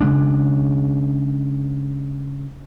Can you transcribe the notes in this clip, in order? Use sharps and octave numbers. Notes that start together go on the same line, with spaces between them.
C#3 G#3 D4